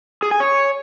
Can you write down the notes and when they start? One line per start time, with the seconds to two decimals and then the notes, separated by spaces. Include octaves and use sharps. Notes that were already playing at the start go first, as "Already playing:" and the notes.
0.23 G#4
0.31 G#5
0.40 C#5